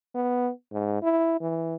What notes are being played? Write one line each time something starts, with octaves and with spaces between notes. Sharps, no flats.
B3
G#2
E4
E3